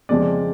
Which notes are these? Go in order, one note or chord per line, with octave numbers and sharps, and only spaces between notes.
F2 C#3 F3 G#3 C#4 D5